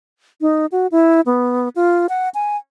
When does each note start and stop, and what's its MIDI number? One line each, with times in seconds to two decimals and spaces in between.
0.41 0.66 63
0.72 0.87 66
0.92 1.21 64
1.26 1.69 59
1.76 2.07 65
2.09 2.29 78
2.34 2.57 80